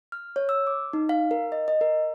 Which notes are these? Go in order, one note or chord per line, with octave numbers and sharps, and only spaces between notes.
F6
C#5
E6
D6
D#4
F5
A#4
D#5
D#5
A#4